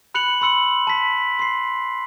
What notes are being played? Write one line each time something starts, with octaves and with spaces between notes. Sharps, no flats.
B5 F#6 C#7 F7 F#7
B5 C6 E6 C#7 F#7
A5 B6
C6 C7